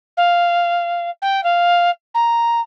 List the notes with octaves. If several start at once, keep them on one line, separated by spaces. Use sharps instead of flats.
F5
G5
F5
A#5